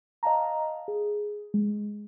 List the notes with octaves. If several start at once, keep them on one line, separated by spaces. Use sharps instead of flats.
D#5 F5 A5 A#5
G#4
G#3